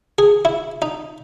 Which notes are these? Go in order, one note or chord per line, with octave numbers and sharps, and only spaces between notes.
G#4
E4
D#4